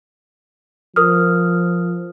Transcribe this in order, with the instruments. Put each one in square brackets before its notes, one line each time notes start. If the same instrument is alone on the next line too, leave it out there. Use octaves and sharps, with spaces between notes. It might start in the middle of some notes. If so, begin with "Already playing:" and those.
[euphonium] F3 [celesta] A#4 D#6 F6